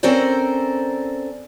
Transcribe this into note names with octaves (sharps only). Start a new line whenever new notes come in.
C4 C#4 A4 A#4 C5 D5